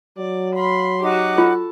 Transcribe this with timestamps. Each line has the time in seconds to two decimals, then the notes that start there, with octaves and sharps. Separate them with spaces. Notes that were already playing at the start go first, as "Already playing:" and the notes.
0.18 F#3 D5
0.56 F5 B5 C6
1.03 D#4 F#4 G4 F#5 D6
1.38 F4 A4